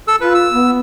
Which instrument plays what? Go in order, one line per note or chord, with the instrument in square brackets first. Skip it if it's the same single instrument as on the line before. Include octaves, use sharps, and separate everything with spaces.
[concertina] A4 E6
[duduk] F4 [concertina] B4
[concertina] E6
[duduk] B3